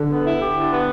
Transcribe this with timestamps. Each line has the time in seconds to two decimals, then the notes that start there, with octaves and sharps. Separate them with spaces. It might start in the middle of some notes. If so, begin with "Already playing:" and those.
Already playing: D3
0.08 B3
0.24 E4
0.39 G4
0.54 D3
0.70 B3